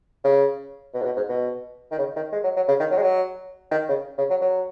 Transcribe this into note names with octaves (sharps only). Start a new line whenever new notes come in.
C#3
B2
G#2
B2
G#2
B2
D#3
C#3
D#3
G#3
F#3
F#3
C#3
D#3
F#3
G#3
F#3
D#3
C#3
C#3
F#3
F#3